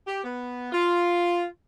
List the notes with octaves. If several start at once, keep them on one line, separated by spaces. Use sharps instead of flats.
G4
B3
F4